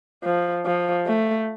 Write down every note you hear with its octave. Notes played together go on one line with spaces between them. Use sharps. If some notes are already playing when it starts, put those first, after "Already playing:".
F3
F3
A3